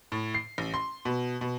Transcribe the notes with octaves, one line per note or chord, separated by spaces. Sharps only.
A2
C7
A1
C6
B2
B2